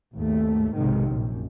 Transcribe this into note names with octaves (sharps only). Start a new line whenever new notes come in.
G#1 D#2 A3
B1 G#2 C3 D#3
A#1 F#2